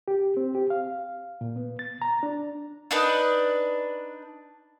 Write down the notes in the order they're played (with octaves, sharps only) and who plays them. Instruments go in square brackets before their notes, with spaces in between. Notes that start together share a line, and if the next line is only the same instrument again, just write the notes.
[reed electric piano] G4
C4
G4
F5
A#2
B3
A6
A#5
D4
[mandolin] D4 D#4 B4